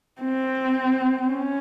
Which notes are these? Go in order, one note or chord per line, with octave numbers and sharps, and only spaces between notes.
C4
C#4